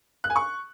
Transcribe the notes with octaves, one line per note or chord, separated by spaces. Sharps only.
F#6
G#5
C#6